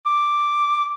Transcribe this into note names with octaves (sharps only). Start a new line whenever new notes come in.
D6